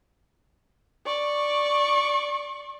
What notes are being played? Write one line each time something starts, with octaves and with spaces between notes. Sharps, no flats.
D5 C#6